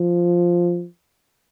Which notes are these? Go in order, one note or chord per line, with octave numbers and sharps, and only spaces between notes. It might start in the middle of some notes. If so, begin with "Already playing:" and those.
Already playing: F3